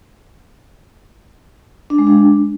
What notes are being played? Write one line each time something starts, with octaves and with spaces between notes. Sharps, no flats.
D4
G#3
D4